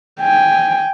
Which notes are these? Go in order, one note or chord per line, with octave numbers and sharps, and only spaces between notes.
G5 G#5